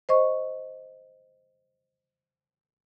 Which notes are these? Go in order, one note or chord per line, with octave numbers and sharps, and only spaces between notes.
C5 D#5 C#6